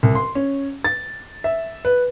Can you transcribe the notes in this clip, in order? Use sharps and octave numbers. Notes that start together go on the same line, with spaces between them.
C2
C6
C#4
A6
E5
B4